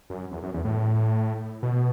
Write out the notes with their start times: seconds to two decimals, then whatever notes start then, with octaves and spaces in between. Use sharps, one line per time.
0.10 F#2
0.32 E2
0.43 F#2
0.54 E2
0.65 A2
1.63 B2